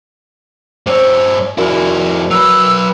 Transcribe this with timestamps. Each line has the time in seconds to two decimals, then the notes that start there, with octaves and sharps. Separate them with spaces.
0.87 G2 C5 C#5 E6
1.58 F2 E4 F#4 A#4 D5
2.31 F#3 B4 E6